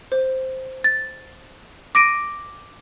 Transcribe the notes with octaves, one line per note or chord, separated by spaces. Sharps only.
C5
A6
D6 A#6 D7 D#7